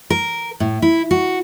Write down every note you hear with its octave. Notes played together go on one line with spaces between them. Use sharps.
A#4
A2
E4
F#4